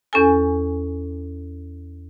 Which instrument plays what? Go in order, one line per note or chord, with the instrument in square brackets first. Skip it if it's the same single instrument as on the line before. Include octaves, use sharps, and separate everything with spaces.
[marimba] E2 C#4 A4 G#5